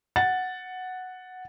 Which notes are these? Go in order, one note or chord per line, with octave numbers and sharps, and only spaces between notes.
F#5 A6